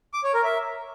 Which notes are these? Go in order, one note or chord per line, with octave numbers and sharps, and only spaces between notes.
D6
C#5
A#4
E5